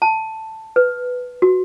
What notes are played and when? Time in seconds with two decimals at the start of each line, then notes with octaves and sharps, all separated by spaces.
0.02 A5
0.76 B4
1.42 F#4